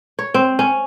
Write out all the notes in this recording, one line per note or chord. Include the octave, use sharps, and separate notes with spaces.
C#5
C4
C#4